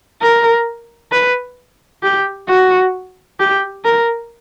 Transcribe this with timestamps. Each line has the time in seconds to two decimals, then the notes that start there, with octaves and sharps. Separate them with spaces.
0.22 A#4
1.12 B4
2.03 G4
2.48 F#4
3.40 G4
3.84 A#4